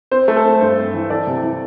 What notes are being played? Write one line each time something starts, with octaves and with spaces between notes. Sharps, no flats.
C4 C5
A3
A4
C4
G2 C5
C4
E3
E3 A4 D5
C3
E3